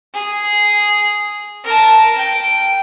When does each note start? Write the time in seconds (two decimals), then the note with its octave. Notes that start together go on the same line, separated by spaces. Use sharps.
0.14 G#4
1.64 A#4 A5
2.18 G5